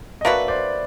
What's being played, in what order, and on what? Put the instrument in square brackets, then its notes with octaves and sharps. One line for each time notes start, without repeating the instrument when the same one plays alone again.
[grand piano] D#5
[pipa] A#3 D4 F#4 B4 [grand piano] D5 E5
[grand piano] C5 D5